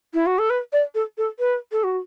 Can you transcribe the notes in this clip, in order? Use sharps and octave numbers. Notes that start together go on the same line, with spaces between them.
E4
F#4
A4
B4
D5
A4
A4
B4
A4
F#4